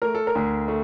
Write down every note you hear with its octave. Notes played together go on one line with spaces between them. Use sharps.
A3 A#4
A4
A#4
D2
A3